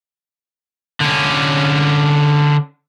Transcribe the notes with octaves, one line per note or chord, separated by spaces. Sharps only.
D3 C#4